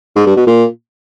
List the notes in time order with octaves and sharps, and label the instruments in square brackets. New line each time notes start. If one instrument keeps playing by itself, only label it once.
[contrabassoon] G#2
G2
B2
A#2